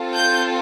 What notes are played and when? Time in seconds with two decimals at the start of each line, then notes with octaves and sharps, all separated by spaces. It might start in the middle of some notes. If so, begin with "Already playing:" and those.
Already playing: C4 F4 A4
0.15 G6